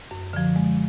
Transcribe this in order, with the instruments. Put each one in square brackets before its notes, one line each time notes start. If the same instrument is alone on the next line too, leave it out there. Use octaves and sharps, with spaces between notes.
[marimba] F#2
D3 F3
G#3